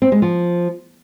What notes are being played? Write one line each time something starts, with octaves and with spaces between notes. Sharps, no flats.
C4
G#3
F3